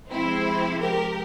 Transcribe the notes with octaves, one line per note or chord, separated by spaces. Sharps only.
C3 F3 G#3 C4 E4
G4 A#4